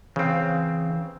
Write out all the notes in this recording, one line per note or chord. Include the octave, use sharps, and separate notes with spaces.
C#3 E3 C4 F5